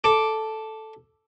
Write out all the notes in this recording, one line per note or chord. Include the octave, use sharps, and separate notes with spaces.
A4 D6